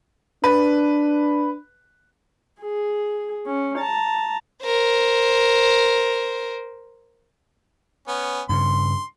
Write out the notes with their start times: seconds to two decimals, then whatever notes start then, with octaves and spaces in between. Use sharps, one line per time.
0.44 D4 B4
2.61 G#4
3.46 C#4
3.79 A5 A#5
4.63 A#4 C5
8.08 B3 C#4
8.49 G2 C#3 C6